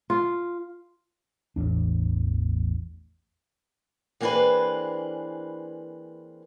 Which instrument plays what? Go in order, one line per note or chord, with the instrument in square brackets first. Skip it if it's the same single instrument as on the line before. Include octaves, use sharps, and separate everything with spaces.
[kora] F4
[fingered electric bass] A1 E2 D4
[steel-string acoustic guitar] E3 A#3 C4 D4 G#4 B4